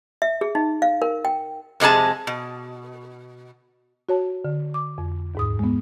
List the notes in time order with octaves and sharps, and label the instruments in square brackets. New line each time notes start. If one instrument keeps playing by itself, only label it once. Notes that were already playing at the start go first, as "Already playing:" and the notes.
[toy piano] E5
G#4
D#4
F5
A#4
G5
[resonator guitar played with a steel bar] F2 C3 G#3 G#4 A5
B2
[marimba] F#4 C#5 A5
D3
D6
F2
D#2 G#2 D#6
G#3 B3